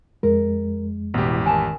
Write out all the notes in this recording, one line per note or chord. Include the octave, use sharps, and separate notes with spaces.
F2 G#3 A#4
A1 B2 E3 G4
D#3 G#5 A5